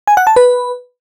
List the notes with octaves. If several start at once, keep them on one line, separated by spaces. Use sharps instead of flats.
G#5
F#5
A5
B4